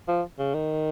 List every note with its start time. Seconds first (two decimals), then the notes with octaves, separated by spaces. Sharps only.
0.08 F3
0.39 C#3
0.54 D#3